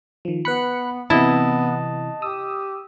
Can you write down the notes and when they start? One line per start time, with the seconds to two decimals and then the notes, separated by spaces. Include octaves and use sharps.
0.25 D#3 F3
0.45 B3 B4 B5 F#6 C#7
1.10 C3 E3 B3 E4 D#5 A5
2.22 G4 D#6 E6